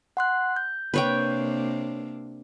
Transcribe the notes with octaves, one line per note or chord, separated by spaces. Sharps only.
F#5 C6 F#6
G6
C3 A#3 D4 B4 C#5 G5